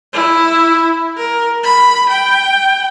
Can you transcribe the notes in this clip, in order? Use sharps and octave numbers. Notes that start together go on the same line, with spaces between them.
E4
A#4
B5
G5